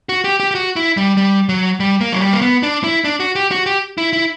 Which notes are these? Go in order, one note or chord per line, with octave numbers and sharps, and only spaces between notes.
F#4
G4
G4
G4
F#4
E4
G3
G3
F#3
G3
A#3
F#3
G3
A#3
B3
D4
E4
D4
F#4
G4
F#4
G4
E4
E4